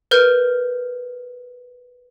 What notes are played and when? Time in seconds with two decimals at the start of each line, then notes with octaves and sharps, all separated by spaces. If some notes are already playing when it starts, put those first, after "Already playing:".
0.11 A#4 B4 F6 G6